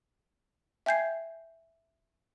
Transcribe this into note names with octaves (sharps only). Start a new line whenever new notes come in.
E5 G5 G#5 G6 G#6 C7